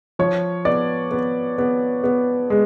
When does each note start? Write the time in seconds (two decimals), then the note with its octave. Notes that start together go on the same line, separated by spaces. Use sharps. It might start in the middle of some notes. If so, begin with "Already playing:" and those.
0.19 F3 C#5
0.65 B3 D5
1.11 B3
1.58 B3
2.04 B3
2.50 G#3